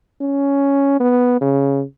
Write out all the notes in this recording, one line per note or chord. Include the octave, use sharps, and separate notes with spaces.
C#4
B3
C#3